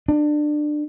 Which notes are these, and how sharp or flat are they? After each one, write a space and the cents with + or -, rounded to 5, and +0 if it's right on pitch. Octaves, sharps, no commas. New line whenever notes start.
D4 +25